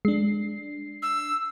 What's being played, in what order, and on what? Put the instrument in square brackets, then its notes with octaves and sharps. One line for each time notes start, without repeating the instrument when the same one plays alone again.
[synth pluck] G#3 [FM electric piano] D4 C7
[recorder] E6